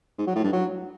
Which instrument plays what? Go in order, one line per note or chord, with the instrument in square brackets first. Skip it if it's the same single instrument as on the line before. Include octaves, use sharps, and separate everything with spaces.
[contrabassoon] G#2
F#3
A2
G2
F#3